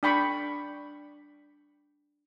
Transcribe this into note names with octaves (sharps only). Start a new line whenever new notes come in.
D4 G5 B5 C#6